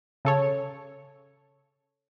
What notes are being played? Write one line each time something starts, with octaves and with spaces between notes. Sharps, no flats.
C#3 A4 C#5